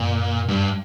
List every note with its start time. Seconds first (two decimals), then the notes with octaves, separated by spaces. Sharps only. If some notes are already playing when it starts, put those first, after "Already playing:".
Already playing: F#2 A#2
0.48 G2